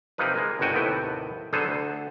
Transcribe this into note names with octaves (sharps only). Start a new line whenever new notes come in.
C3 F3 A#3 D#4 B4
G#3 A#3
G1 G2 B2 F#4 G5 G#5
D#2 A2 C3 B3 B4 G5
D3 F#3 B3 G#4 A4 C5
D2